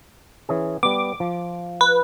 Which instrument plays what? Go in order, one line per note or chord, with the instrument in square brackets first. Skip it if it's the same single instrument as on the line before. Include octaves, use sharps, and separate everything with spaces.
[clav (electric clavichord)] E3 C#4 G#4
[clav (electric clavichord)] G3 B3 [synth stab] D6
[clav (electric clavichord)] F3
[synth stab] B4